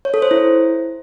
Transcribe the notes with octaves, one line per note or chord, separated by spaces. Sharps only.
C#5
A4
C5
E4